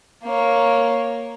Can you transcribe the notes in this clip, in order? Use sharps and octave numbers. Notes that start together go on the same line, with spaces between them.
A#3 C#5